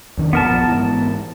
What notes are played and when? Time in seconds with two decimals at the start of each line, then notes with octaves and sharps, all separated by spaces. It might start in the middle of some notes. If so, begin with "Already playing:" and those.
0.17 E2 D#3 D4
0.33 A#1 F#2 B3 A#4 A5
0.45 A#1 F3
0.68 G#2 E3